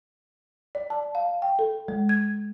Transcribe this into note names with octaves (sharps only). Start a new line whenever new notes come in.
D5
A5
F5
G5
A4
G#3
G#6